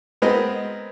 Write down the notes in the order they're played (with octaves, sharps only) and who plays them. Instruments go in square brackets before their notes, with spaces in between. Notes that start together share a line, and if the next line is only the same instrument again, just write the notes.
[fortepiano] G#3 B3 C4 A#4 D#5